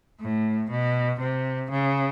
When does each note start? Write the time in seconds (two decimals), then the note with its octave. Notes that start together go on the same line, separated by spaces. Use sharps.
0.21 A2
0.70 B2
1.21 C3
1.70 C#3